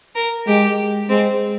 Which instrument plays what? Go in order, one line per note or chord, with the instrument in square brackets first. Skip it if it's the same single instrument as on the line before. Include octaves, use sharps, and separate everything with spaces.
[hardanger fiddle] A#4
[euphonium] G#3 [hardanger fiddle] G4
[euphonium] G#3 [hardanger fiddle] C4